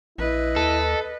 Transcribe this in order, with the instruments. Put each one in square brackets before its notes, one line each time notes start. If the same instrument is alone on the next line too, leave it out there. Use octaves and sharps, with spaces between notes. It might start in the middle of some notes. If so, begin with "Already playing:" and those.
[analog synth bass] A#1 [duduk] E4 [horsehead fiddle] B4 D#5
[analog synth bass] D#2 [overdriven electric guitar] A4